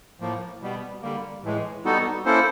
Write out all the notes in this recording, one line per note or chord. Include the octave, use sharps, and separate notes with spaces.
A2 F3 A#3
B2 G3 B3
D3 G3 A#3
A2 E3 G#3
G3 B3 D#4 F#4 A4
A#3 C#4 E4 A4 C5